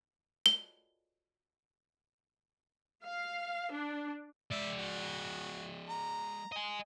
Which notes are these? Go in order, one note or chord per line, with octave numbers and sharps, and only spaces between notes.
G7
F5
D4
G#3 D5 E5
F#4
A#5
D#5 G#5